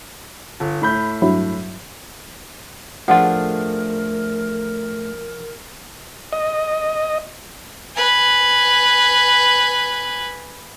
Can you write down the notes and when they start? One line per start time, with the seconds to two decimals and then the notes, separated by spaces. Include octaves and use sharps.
0.60 G1
0.82 A2 B5 G6
1.22 G2 F#3 E4
3.08 A2 F3 A3 D4 F4 G#4 A#4 F#5
6.33 D#5
7.96 B4 G#5